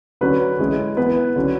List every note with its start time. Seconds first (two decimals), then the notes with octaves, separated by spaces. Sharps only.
0.21 D3 F#3 C#4 B4
0.59 E3 G#3 C#4
0.97 E3 B3 B4
1.36 D3 F#3 C#4